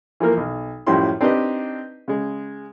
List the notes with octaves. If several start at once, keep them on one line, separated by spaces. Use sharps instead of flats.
E3 F3 A#3 A#4
B1
F#2 A2 F3 G3 E4 C6
C4 D4 D#4 G4 B4 D#5
C#3 G#3